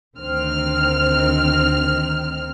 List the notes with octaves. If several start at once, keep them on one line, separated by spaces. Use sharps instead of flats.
D2 D#3 C4 F6